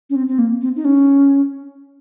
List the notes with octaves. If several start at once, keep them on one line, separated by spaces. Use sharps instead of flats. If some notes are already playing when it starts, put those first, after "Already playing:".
C#4
C4
C4
A#3
C4
D#4
C#4